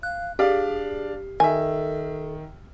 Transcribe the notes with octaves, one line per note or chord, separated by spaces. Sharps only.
F5 F#6
D4 G4 G#4 D5 F5
D#3 A4 E5 G#5